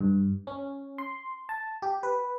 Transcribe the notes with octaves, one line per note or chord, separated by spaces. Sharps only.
G2
C#4
C6
A5
G4
B4